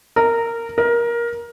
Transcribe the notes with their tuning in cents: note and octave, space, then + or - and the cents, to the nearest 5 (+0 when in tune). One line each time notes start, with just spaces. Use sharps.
A#4 -15
A#4 +15